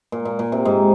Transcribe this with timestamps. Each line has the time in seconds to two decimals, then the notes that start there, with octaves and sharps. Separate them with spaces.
0.12 A#2
0.25 A#2
0.39 A#2
0.52 C3
0.65 G#2